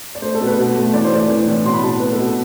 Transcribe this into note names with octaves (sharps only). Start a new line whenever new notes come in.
D5
A3 C5
A4
B2
B4
B2
A3
E3 D5
C5
A3 D5
E3
A2
B2 C6
B5
B2 A5
B2 B4
A4
B2